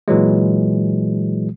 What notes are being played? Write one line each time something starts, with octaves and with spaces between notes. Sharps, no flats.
A#2 E3 F#3 G#3